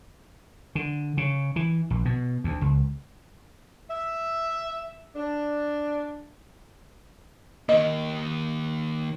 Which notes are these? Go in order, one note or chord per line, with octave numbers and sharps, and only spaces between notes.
D3
C#3
E3
A#1
B2
D2
C#2
E5
D4
D#3 A#3 D#5